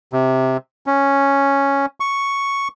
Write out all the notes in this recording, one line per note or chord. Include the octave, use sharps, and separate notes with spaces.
C3
C#4
C#6